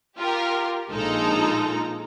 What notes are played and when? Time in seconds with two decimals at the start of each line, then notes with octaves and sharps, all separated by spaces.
0.18 F4 G4 A#4
0.90 A#1 G#3 D#4 F4 A4 A#5